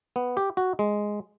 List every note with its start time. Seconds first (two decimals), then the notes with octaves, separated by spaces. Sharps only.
0.16 B3
0.37 G4
0.57 F#4
0.79 G#3